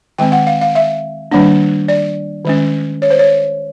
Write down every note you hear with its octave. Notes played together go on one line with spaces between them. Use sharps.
D#3 G#3 C4 G5
F#5
F5
F5
E5
D#3 G3 A#3 D4
D5
D#3 G#3 C#4
C#5
C5
C#5